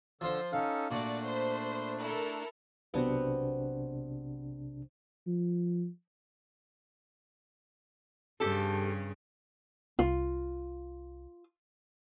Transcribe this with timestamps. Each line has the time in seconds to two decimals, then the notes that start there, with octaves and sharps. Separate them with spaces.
0.21 D3 F3 F4 C5 E6
0.53 C#4 D#4 A4 F5
0.91 A#2 A3 D4 F#4 D5
1.26 C5 B5
2.01 E4 A4 A#4
2.94 B1 C3 B3 C4 D4 F#4
5.27 F3
8.40 G2 C#3 G4 A4
9.99 C2 F4